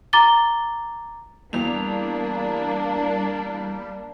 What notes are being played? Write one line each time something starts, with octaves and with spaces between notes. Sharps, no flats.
A#5 D6 A6 G7
E2 G3 A#3 D4 F7